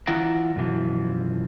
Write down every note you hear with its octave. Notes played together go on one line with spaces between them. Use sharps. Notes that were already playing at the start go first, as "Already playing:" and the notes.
E3 E4 F4 F#5 A#5
F#2 B2 E3 F3